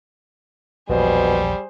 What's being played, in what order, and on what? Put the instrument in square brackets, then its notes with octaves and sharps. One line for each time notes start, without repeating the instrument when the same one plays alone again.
[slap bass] A#1 E2 [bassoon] B2 [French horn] G3 [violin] G#4 C5